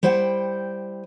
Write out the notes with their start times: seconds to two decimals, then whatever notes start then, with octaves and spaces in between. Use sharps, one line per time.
0.03 G3 E4 C5 F#5 G5